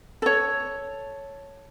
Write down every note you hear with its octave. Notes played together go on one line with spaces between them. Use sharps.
A4 C#5